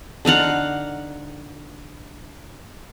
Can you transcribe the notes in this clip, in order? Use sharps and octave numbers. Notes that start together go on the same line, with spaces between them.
D3 D#4 F5 F#5